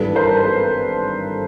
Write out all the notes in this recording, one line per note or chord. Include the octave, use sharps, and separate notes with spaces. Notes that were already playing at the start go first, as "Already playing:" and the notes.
Already playing: G#1 G2 E3 G3 A4 B4
A#4 C5
A4 B4